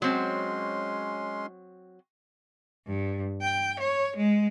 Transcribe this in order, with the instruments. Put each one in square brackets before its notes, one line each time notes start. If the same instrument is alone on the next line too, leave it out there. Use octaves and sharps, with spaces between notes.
[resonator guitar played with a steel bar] F#3 C4 [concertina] G#3 C#4 C6
[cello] G2
G5
C#5
G#3